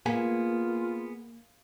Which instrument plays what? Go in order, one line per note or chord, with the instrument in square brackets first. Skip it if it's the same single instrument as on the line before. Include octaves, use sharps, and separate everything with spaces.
[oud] A#3 [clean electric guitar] B3 G#4 G#5 [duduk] F4